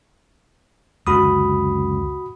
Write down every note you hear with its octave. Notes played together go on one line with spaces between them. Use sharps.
C#2 F#2 D3 F#4 B5 D#6